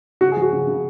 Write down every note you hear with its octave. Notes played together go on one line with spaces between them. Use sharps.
C#3 F#4
G#4
F3
F#4
C#3
C#3